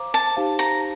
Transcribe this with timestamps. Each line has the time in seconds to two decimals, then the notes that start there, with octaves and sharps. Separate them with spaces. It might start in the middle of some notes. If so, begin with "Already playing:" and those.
Already playing: C5 F5 A#5 D6
0.14 A5
0.36 D#4 G4 C5 F5 A5
0.59 A#5